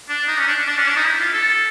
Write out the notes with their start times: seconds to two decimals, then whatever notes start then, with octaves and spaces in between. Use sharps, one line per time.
0.09 D4
0.28 D#4
0.38 C#4
0.47 D4
0.67 D4
0.77 C#4
0.87 D4
0.96 D#4
1.06 E4
1.20 F4
1.33 A4